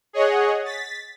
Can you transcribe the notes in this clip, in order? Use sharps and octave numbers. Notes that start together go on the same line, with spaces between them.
G#4 C#5 D#5 F#5
A6 B6